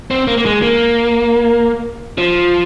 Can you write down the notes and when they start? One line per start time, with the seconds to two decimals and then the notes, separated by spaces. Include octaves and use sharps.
0.11 C4
0.27 A#3
0.38 A#3
0.46 G#3
0.62 A#3
2.18 F3